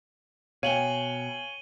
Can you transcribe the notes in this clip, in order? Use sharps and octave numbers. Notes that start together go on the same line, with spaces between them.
B2 C#5 F5 G5 G#5 D#7 F#7 G7